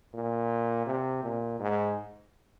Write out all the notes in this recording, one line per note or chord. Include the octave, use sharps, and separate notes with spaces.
A#2
C3
A#2
G#2